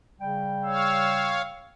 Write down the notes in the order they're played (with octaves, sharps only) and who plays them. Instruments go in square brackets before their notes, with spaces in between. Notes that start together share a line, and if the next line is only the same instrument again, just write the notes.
[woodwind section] C#3 G3 G5
[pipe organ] C#5 F5 [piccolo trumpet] E6